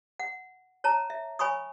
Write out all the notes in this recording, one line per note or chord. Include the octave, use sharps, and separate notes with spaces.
F#5
C#5 A5 A#5
E5
C#5 G#5 B5 C#6 D#6